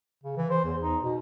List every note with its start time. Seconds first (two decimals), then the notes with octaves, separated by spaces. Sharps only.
0.24 C#3
0.37 E3
0.50 C5
0.64 E2
0.81 D#4
1.03 B2